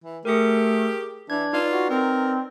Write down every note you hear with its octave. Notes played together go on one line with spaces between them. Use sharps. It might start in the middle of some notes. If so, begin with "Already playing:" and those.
E3
A3 G4 G#4 A#4
E3 D4 G#6
D#4 F4 B4 D5
F#4
C4 A#4